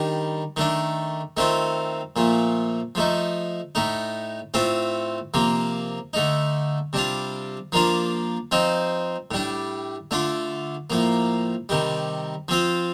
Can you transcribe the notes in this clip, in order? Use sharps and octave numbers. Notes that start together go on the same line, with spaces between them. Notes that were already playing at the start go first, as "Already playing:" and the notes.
Already playing: D#3 G3 D4
D#3 A3 D4
D#3 A3 C4 F4
A#2 F3 A3
F3 A3 D#4
A2 A3 D#4
A2 A3 C4 F4
C3 F3 A#3
D3 A3 D#4
C3 G3 D4 F4
F3 A#3 D4 F4
F3 C4 D#4
A2 G3 D4
D3 A3 D4 F4
A2 F3 A#3
C3 D#3 G3
F3 C4 F4